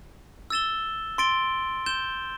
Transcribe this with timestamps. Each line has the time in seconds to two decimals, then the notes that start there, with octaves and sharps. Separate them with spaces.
0.50 E6 A6 E7 G7
1.18 C6 A6 D7 G7
1.86 G6 E7 G7